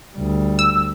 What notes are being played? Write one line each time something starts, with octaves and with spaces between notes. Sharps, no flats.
D2 G3
E6